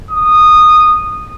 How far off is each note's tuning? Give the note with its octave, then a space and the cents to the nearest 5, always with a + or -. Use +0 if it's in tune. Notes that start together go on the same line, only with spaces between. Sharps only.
D#6 -15